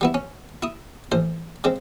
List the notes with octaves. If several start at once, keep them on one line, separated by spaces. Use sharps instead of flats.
G3 B3 E4
C#4
E4 D#6
A1 C5
C#3 G#3 C4